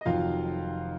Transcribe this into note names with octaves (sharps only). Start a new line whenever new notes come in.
D#5
F1 F2 D#3 F#3 F4 F5